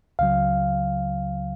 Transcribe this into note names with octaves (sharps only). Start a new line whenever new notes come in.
C#2 C#3 F#3 F5